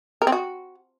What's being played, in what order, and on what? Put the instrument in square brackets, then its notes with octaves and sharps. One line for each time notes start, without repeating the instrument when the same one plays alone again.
[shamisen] A#4
C4
F#4